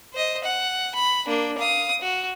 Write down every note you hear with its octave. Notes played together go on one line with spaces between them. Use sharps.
C5 D#5
F#5
B5
A#3 D4
F5 D#6
F#4